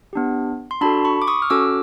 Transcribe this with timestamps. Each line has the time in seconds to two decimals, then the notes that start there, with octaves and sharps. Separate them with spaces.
0.13 B3 D4 G4
0.71 C6
0.81 D4 F#4 A4 A5 B5
1.05 B5 C#6
1.22 D6
1.27 C#6 D#6
1.42 F6
1.50 C#4 F#4 A4 D6 E6